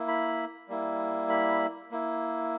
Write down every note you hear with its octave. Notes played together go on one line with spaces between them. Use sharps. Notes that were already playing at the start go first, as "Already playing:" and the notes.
Already playing: A#3 E4
B5
G3 A#3 E4
B5
A#3 E4